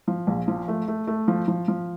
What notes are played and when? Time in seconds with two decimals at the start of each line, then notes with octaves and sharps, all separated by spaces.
0.08 F3
0.27 A#1
0.48 F3
0.68 A3
0.88 A3
1.07 A3
1.28 F3
1.48 F3
1.68 F3